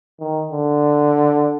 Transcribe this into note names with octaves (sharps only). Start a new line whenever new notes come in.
D#3
D3